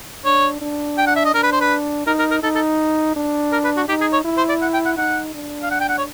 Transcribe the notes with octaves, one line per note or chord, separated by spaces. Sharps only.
D4 C#5
D4
G5
F#5
E5
D#5
D4 A#4
B4
C5
B4
D#4 A#4
A#4
A#4
D#4 A4
A4
D4
A#4
B4
F#4
D#4 G4
G#4
C#5
E4
C5
D5
F#5
G5
F#5
D#4 F#5
D4
F5
F#5
G5
F#5
C#5